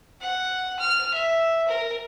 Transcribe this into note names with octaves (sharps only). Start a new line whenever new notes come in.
F#5
F6
E5
A#4